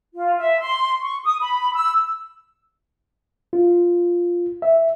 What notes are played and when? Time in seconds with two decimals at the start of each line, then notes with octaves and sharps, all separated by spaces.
0.14 F4
0.37 E5
0.61 C6
1.01 C#6
1.24 D#6
1.41 B5
1.73 E6
3.53 F4
4.62 E5